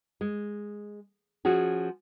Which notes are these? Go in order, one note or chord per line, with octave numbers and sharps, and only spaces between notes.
G#3
F3 C#4 F#4 G#4